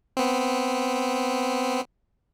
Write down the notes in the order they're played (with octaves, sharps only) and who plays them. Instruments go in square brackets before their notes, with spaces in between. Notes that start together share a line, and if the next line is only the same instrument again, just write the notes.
[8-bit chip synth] B3 C4